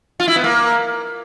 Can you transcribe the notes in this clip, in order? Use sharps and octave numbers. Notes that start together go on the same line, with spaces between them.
F4
E4
B3
A#3